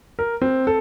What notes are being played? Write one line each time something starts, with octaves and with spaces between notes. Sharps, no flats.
A#4
C4
A4